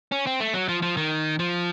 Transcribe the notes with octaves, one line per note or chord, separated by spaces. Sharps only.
C#4
C4
A3
F#3
F3
F3
D#3
F3